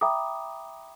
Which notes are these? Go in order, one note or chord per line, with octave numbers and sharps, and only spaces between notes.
E5 G5 A#5 B5 D6 D#6